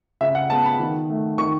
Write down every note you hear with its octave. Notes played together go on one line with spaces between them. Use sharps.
C#3 E5
F#5
G#3 B3 A5
B5
D#3
A3
D#3 C#6